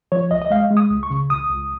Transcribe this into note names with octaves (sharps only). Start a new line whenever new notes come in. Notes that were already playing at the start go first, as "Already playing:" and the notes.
F3 C#5
C#2 D#5
D#5
G#3 F5
G#3
D#6
C#2
C#6
C#3
C#2 D#6
C#2